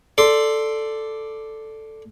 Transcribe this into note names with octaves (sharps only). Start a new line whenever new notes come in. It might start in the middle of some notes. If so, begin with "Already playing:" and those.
A4 D5 C6